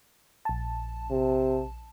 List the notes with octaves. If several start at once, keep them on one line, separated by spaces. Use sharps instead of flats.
A#1 A5
C3